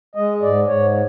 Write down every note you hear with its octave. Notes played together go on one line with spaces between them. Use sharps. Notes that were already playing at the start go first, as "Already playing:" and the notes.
G#3 D#5
G#2 D5
G#2 C#5